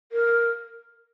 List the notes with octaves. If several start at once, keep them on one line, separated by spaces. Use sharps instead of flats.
A#4